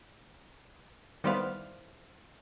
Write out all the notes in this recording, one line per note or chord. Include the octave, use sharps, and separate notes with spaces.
D#3 G3 B3 E4 C5 F5